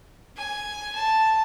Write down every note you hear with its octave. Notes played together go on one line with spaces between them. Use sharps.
G#5
A5